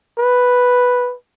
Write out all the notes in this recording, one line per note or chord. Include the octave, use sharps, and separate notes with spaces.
B4